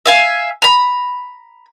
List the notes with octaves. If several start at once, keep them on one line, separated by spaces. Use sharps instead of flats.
E5 F5 G#5
A#5 B5